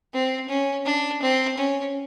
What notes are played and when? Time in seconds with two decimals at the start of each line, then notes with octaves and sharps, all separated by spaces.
0.14 C4
0.48 C#4
0.85 D4
1.22 C4
1.57 C#4